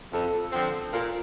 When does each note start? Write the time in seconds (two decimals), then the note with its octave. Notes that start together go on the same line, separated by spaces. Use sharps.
0.13 F2 A4
0.52 D3 F3 C4
0.93 A#2 A#4